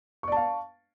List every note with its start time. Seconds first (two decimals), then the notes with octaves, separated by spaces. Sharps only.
0.23 C#6
0.28 D5
0.32 A5
0.37 F5